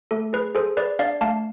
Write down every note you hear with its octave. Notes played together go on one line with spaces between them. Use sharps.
A3 A4
G#4 B4
G#4 A4 C5
G#4 B4 D5
D4 D5 F5
A3 F5 A5